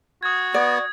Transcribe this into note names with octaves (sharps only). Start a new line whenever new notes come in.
F#4 D#6 G#6
B3 D5